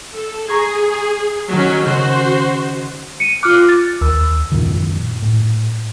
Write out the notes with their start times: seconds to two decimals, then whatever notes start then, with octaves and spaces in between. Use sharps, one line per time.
0.14 A4
0.48 G#4 A#5 C#6 G#6
1.52 D#3 F#3 C#4
1.85 C#3 F#4 C5 G6
3.20 C#7 D#7
3.43 F4 D6 F6 F#6
3.69 A6
4.01 D#2 E6
4.52 F#2 A#2 D#3
5.22 A2